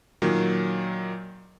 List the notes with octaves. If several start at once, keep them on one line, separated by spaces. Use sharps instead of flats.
A#2 D#3 F#3